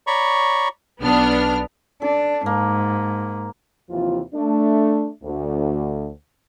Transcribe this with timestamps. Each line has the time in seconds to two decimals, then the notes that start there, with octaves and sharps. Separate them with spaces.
0.07 C#5 D5 A#5 B5 C#6
1.02 B1 B3 D4 F6
2.02 D4 A4
2.46 G#2 A#3
3.90 D#2 C3 E3 F3 F4
4.34 A3 D4
5.23 D2